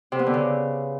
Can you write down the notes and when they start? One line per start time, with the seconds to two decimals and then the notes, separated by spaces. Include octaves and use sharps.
0.12 C3
0.19 B3
0.26 D3
0.34 C#3